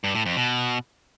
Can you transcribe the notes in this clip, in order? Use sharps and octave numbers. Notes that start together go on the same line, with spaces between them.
G2
A2
F2
B2